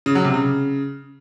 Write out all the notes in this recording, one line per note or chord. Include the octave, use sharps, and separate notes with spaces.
C#3
F#3
C3
C#3